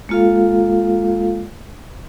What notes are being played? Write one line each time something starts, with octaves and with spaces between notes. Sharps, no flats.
G#3 A#3 F4 A4 F5